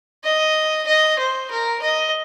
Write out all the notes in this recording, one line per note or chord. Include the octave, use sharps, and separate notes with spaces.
D#5
D#5
C5
A#4
D#5